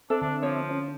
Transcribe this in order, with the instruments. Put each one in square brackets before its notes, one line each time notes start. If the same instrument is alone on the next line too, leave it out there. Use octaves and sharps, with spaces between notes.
[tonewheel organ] C4 E5 [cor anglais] D4 [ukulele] A4
[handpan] D3 [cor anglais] D4
[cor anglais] F3 [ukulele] C#5
[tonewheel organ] C#4